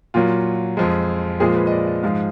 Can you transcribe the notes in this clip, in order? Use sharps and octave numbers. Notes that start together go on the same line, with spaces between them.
A#2 F#3 F4
F2 F3 G#3
A#2 F3 G#3 G#4
B4
D#5
D5
D#5
G#2 F3 G#3 F5